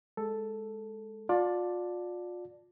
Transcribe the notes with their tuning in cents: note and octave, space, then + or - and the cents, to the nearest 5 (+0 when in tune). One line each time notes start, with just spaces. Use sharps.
G#3 +0 A4 +0
F4 +35 D5 +5 A5 +0